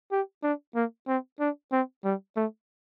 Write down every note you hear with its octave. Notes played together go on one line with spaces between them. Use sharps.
G4
D4
A#3
C4
D4
C4
G3
A3